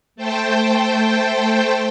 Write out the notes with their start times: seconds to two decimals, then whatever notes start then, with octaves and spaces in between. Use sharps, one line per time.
0.16 A3 A4 C5 G5